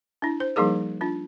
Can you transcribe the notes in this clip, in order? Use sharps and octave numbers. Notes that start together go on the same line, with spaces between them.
D4 E4
C5
F3 G3 A#3 D#4 G#4 A#4
D4 F4